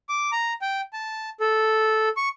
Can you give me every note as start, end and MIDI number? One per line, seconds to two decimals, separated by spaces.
0.09 0.31 86
0.32 0.53 82
0.62 0.81 79
0.93 1.30 81
1.40 2.09 69
2.17 2.29 85